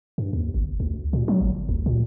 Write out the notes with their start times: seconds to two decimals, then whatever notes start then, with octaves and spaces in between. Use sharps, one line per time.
0.18 G2
0.33 D#2
0.54 G1
0.80 D2
1.13 A#2
1.28 F#3
1.41 G1
1.69 D2
1.86 A#2